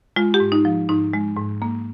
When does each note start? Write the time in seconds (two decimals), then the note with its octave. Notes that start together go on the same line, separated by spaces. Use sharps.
0.16 G#3 F4
0.34 G4
0.40 G#2
0.52 D#4
0.65 F3
0.89 G#2 D#4
1.13 G#3
1.36 G#2
1.62 A#3